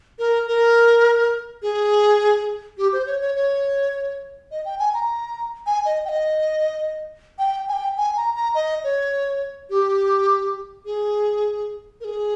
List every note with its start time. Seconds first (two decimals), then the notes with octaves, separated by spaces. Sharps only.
0.19 A#4
0.48 A#4
1.62 G#4
2.78 G4
2.93 C5
3.06 C#5
3.21 C#5
3.36 C#5
4.51 D#5
4.65 G5
4.80 G#5
4.94 A#5
5.66 G#5
5.86 D#5
6.05 G5
6.09 D#5
7.39 G5
7.69 G#5
7.73 G5
7.97 G#5
8.17 A#5
8.35 A#5
8.55 D#5
8.84 C#5
9.70 G4
10.86 G#4
12.01 A#4
12.04 G#4